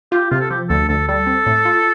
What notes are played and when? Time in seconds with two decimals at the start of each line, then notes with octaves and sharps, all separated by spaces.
0.12 F4 G4
0.31 C3 F4
0.40 A4
0.50 F3 G4
0.69 D2 A4
0.89 D2 A4
1.08 G3 A4
1.27 C4
1.46 A2
1.65 F4